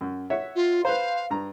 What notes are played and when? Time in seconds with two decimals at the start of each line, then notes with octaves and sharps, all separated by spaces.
0.01 F#2
0.30 C#5 E5 F#5
0.56 F4
0.85 B4 C5 F5
1.30 G2 A#5